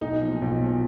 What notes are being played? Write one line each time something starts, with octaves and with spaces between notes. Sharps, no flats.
B1 D#4
A#2 F3
B1
A#2 F3